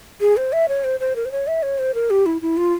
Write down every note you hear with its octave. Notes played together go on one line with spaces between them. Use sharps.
G#4
C5
E5
C#5
C5
C5
A#4
C5
C#5
E5
C#5
C5
A#4
G4
E4
E4
F4